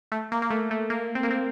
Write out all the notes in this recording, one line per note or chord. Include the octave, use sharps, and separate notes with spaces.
A3
A#3
A#3
A3
A3
A#3
C4
A#3
C4